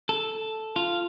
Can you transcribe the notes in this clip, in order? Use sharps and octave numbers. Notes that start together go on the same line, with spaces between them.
A4
F4